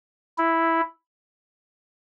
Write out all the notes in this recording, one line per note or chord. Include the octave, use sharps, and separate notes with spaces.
E4